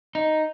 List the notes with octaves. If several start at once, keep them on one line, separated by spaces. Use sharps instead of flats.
D#4